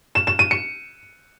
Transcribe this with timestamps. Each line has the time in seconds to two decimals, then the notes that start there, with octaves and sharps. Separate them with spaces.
0.15 E7
0.27 E7
0.39 D#7
0.51 C#7